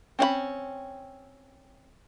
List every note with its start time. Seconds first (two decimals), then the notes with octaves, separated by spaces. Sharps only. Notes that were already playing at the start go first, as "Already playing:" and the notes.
0.19 C4 C#4 F5 B5